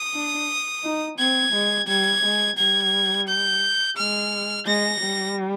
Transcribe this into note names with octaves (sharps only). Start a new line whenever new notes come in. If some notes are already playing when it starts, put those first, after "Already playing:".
Already playing: D#6
D4
D#4
C4 G#6
G#3
G3 G#6
G#3
G3 G#6
G6
G#3 F6
G#3 A#6
G3